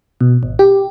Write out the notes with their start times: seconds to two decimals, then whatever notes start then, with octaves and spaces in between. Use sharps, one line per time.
0.21 B2
0.43 G#1
0.59 G4